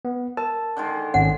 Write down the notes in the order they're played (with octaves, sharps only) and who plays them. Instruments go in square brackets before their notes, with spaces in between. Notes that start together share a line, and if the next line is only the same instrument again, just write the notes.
[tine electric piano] B3
[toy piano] A#4 [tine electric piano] A5
[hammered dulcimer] D3 D#3 G#3
[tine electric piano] G#1 C#4 [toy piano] F#5